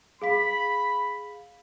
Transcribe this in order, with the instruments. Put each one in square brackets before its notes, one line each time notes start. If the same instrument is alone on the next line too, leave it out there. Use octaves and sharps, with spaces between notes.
[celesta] G#4 F5 B6 [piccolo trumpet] B5